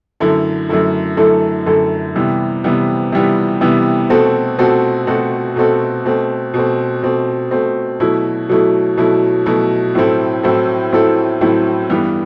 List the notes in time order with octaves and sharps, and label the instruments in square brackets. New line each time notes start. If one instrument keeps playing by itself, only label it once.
[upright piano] F#2 D3 A3 E4 A4
F#2 D3 A3 E4 A4
F#2 D3 A3 E4 A4
F#2 D3 A3 E4 A4
C3 E3 G3 B3
C3 E3 G3 B3
C3 E3 G3 B3
C3 E3 G3 B3
B2 A3 C4 F#4 A4
B2 A3 C4 F#4 A4
B2 A3 C4 F#4 A4
B2 A3 C4 F#4 A4
B2 A3 C4
B2 A3 C4
B2 A3 C4
B2 A3 C4
B2 F#3 A3 E4
B2 F#3 A3 E4
B2 F#3 A3 E4
B2 F#3 A3 E4
A2 F#3 C4 E4 A4
A2 F#3 C4 E4 A4
A2 F#3 C4 E4 A4
A2 F#3 C4 E4 A4
G2 E3 G3 B3